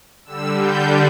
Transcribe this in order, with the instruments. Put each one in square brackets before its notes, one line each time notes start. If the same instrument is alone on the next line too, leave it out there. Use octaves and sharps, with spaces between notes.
[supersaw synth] D3 G3 E6
G6